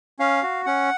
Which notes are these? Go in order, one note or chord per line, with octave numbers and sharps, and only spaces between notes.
C#4 F5
F#4
C#4 F#5